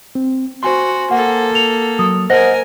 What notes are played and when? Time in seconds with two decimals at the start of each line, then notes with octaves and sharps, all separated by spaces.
0.15 C4
0.63 F#4 C5 G#5 C6
1.11 A#3 A4 F#5
1.55 F7
1.99 F#3 D#6
2.30 A#4 C5 D#5 F#5 G#5 A#6